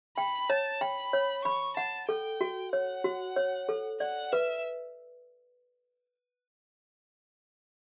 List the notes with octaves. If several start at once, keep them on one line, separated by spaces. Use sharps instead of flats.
G5 B5
C#5 A5
G5 B5
C#5
B5 C#6
F#5 A5
A4 G5
F#4
C#5 F#5
F#4
C#5
A4
D5 F#5
B4 E5